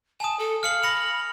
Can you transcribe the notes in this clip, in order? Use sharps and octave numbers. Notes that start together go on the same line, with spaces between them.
G#5 A5 D#6
A4
F5 F6 C#7 F#7
B5 A#6 C#7 F7